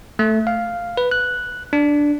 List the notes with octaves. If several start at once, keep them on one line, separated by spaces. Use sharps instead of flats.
A3
F5
B4
F#6
D4